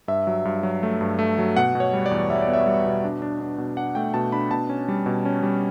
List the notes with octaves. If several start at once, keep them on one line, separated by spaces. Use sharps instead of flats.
G2 E5
F#3
G2
F#3
A3
G2
A3
F#3
B2 F#5
B2
C#5
G3
D5
E2
G3 E5
D5
B3
E5
G3
B2
D4
D4
D4
B2
D4 F#5
A3 G5
B2 A5
D4 B5
B2 A5
C#4
G3
B2
C#4
G3